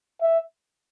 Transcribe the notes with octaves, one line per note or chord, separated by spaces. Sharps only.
E5